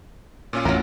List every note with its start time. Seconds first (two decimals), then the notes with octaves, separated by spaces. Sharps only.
0.53 A#2 C#4 F4
0.65 A1 F2 F#3 A#4